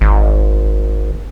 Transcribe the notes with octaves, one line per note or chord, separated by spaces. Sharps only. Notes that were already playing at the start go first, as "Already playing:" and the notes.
G#1